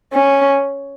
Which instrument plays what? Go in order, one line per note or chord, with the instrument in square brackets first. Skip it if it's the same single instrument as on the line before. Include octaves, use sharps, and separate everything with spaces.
[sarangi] C#4